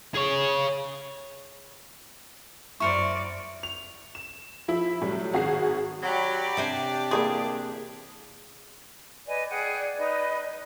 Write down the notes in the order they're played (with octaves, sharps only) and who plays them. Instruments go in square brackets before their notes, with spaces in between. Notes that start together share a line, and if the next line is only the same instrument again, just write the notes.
[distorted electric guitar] G#4 C#5
[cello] F#2 D5 [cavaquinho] E4 A#4 C5 [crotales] C#6 C#7
[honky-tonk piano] F7
E7
F3 E4
A2 F#3 G3
G#1 F#4 G#4 C7
[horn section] F#3 B5 [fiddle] G4 D5
[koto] C3 C5 G#5 [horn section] D4
[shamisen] E3 A3 A#3 [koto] G#4
[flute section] B4 D#5 G#5 [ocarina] D5
[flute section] G#4 F#5 G5
D#4 B4 D#5